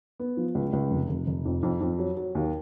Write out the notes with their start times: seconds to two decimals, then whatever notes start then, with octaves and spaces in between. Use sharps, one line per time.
0.20 B3
0.37 F3
0.55 C#2
0.73 C#2
0.91 F1
1.09 F1
1.27 F1
1.45 F2
1.63 F2
1.81 F2
1.99 F#3
2.17 F#3
2.35 D#2